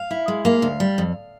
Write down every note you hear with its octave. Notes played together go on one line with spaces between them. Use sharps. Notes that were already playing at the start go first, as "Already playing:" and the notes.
Already playing: F5
E4
G#3
A#3 F5
D2
G3
F2